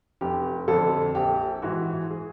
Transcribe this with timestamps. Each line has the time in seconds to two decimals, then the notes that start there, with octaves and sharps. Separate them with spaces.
0.21 F1 G4
0.68 F2 D3 A4
1.15 A#1 G4
1.62 G#2 E3 F#4
2.10 G#4